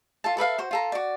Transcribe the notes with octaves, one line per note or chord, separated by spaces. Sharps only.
F4 A4 A5
A4 B4 E5 F5
F#4 C5
F4 A4 A#5
F#4 D5